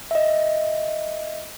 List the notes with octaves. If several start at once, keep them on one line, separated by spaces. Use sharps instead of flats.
D#5 E5